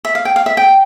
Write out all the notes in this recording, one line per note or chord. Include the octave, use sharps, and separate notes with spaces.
E5
F5
G5
F5
E5
G5